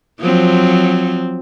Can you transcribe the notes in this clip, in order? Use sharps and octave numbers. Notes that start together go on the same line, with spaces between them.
F3 F#3 C4